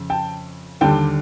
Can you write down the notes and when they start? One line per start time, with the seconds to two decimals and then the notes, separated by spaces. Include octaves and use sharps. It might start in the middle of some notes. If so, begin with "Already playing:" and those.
Already playing: F2 C#3
0.10 G5 A5
0.81 D#2 D3 G3 G5 A5